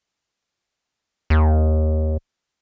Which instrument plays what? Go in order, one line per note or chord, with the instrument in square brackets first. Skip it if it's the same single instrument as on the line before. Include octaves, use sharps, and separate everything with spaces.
[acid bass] D#2